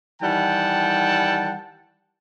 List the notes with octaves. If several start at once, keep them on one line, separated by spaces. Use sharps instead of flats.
D#3 E3 G3 F#5 G5 A5